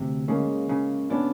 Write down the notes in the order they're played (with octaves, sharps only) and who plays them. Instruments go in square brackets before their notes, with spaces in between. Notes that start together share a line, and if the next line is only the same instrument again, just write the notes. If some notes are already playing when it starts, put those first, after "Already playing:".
Already playing: [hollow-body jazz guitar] D2 C3
[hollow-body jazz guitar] C#3 [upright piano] G#3 A#3
[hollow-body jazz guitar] C#3
[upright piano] B3 C#4 [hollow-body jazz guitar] D4